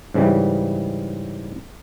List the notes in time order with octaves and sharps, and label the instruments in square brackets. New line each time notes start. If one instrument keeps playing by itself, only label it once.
[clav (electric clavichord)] G#2 C#3 E3 G3